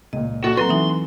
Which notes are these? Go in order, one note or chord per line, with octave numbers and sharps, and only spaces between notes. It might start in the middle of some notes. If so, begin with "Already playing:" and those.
C#2 A#2 D#5
A#1 F#4 A4
F#3 C4 A4 B4 A#5 C6
E3 D#4 E5